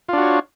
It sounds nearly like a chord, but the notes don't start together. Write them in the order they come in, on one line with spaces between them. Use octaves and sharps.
F4 D4 F#4 C#5